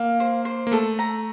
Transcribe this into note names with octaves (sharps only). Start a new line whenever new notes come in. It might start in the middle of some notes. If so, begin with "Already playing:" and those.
Already playing: A#3 F5
C5
C5
A#3
A3 A4
A#5